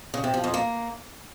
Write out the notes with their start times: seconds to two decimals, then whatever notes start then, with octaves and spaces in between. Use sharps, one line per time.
0.14 C#3
0.24 C3
0.34 F3
0.44 F2
0.54 A#3